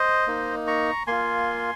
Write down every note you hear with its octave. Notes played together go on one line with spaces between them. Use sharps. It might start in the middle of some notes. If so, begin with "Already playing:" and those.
Already playing: C5 D#5
A#3 D#4
A#5 C#6
A#3 F4 G#5 C6